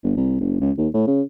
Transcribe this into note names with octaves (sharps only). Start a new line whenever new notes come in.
G1
C2
F#1
C#2
D#2
A2
C#3